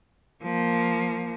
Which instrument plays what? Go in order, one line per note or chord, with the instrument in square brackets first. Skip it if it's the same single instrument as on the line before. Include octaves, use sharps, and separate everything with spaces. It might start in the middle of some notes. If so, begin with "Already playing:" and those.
[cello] F3 A#3